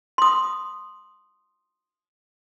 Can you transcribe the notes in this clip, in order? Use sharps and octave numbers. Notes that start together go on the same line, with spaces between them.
C6 D#6